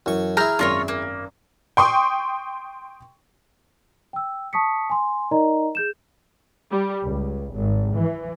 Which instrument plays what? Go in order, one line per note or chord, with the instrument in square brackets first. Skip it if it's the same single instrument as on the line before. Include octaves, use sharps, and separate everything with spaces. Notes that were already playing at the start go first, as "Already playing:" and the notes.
[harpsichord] F#2 C#6 [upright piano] E3
[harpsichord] E4 G#4 [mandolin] A#5 F6 G6
[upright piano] G#1 F#2 [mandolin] F4 A#4 C#5
[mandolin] A#3
[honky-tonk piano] G5 C6 C#6 D#6
[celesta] G5 E6
A5 C#6 D#6 B6 C#7
G#5 C6
D#4 A#4 D5 D#5 A#5
G#4 G6 E7
[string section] G3
C#2
G#1
E3